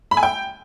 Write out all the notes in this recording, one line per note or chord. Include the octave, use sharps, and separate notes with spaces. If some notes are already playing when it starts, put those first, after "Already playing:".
B5
G#5
G5